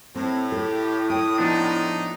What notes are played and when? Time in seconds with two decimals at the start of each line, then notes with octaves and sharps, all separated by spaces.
0.15 A2 C4
0.52 G4 A4
1.10 G5 D#6
1.38 F3 B3 D4 D#4